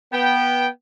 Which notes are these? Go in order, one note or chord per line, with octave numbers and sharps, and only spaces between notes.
B3 G5